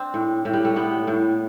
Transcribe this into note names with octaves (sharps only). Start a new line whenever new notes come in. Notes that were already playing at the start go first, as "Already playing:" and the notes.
Already playing: C4 D4
A2
A2
G3
A3
A2 B3
A2